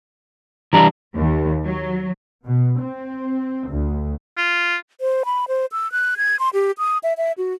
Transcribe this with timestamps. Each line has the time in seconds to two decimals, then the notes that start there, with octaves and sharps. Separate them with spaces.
0.73 E3 G3 D4 A#5
1.16 D#2
1.65 F#3
2.44 B2
2.80 C4
3.68 D2
4.37 F4
5.01 C5
5.25 B5
5.48 C5
5.72 E6
5.92 F#6
6.17 G#6
6.39 C6
6.54 G4
6.78 D#6
7.03 E5
7.17 E5
7.38 F#4